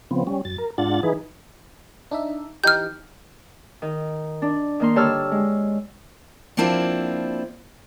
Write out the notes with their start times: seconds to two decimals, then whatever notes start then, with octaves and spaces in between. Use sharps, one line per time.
0.11 C#3 F3 B3 C4
0.27 G3 C#4
0.45 F#2 A6
0.58 A#4
0.78 G#2 D4 F4 F#5 A6
1.03 E3 D#4 G#4 B4
2.11 D4 D#4 E5
2.64 E3 D#4 G4 F6 G6
3.82 D#3
4.42 D4
4.80 D#3 A#3 C6
4.95 G2 D3 C#5 A5 E6 F6
5.31 G#3
6.57 F3 A#3 C4 D4 E4 F4